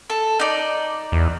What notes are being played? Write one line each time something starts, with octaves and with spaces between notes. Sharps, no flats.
A4
D#4 D5
E2